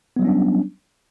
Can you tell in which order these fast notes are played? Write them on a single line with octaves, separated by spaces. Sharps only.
B3 F#3 G3 C#4 D4